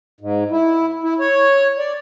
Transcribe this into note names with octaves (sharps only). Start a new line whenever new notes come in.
G#2
E4
E4
C#5
D5